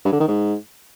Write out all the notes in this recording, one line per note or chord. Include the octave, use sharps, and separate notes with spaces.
G2
D3
D#3
G#2